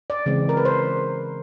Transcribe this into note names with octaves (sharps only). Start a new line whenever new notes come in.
D5
C#3 E3 G#3 C4
A#4
B4
C5